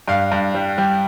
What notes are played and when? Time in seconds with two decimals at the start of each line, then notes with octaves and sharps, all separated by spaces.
0.08 G2 F5
0.32 G2
0.55 G3
0.78 G3